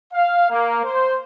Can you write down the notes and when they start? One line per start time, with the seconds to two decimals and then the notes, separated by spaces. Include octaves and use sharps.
0.13 F5
0.51 A#3
0.84 C5